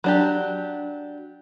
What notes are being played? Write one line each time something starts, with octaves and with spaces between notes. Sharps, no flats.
F#3 D4 G4